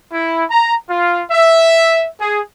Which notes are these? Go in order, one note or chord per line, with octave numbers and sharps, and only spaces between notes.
E4
A#5
F4
E5
G#4